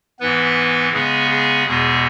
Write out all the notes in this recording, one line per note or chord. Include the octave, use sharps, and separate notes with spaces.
G#2 E3 B3 B4
C#3 G#3 B3 G#4
G#4
E2 B2 G#3 B3 G#4